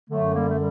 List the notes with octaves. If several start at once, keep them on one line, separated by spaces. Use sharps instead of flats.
F#2 D3 F#3 A3
G3 A#3
A3
G3